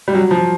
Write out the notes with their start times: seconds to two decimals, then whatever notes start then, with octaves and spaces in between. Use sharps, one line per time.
0.08 G3
0.15 F#3
0.31 F3